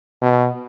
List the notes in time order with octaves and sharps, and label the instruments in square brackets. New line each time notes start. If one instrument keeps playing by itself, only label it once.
[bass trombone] B2